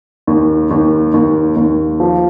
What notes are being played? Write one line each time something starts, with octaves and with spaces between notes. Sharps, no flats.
D#2
D#2
D#2
D#2
F3